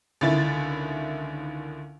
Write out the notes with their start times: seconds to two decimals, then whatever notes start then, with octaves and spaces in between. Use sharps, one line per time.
0.21 C#2 D3 D#3 E4 A6